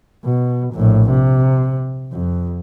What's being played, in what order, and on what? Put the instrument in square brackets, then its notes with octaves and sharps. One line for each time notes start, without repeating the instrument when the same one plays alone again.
[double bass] B2
A#1 A2
C3
F2